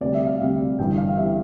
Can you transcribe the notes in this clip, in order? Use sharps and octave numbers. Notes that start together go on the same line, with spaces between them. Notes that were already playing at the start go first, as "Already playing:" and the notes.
D2 C3 G3 D5
E5
F5
D2 C3 G3
G1 G2 E3 G3 G5
F5
E3 G3 E5